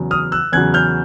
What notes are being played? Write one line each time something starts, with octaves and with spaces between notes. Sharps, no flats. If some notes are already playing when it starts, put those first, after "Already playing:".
Already playing: E2 C#3 F#3
D#6 F6
E6 F#6
E2 C#3 F#3 F#6 G#6
F6 G6